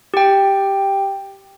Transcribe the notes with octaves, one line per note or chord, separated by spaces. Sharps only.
G4 G5